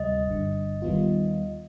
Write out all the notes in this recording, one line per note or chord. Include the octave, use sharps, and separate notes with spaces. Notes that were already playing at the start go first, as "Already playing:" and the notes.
Already playing: D2 C3 G3 D#5
G1 G2 D3
D#2 D#3 G3 B3 F4